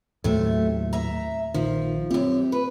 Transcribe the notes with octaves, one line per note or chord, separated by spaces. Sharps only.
D#2 A2 C3 F#3 A3
E5 A#5
A#1 D#3 F3
F#2 C4 G4
B4